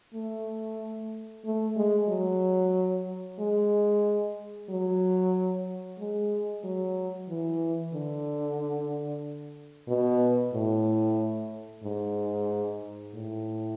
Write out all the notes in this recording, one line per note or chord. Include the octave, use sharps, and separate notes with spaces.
A3
A3
G#3
F#3
G#3
F#3
G#3
F#3
E3
D3
B2
A2
G#2
A2